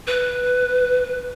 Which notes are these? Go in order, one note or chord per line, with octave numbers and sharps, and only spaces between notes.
B4